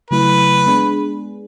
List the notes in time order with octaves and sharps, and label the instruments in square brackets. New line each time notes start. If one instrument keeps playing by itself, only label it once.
[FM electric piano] C#3 F#3 A3 E4 [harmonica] B4
[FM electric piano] G#3 B3 D4 G#4